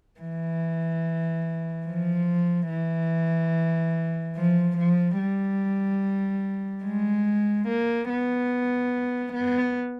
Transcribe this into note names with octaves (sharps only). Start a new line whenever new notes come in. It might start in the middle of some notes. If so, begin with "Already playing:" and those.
E3
F3
E3
F3
F3
G3
G#3
A#3
B3
B3